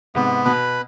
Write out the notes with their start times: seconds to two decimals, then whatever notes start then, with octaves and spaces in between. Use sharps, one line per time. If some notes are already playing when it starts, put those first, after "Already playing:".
0.15 G#2 C3 B3
0.45 B2 B4